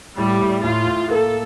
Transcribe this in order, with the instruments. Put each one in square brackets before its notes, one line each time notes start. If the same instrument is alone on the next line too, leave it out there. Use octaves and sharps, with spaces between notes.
[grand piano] A2 [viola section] G3
[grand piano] A2
[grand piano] A2 [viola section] F4
[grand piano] A2
[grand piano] A#3 [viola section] A4